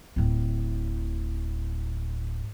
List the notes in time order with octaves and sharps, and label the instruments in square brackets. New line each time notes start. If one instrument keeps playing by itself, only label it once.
[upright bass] D1 A2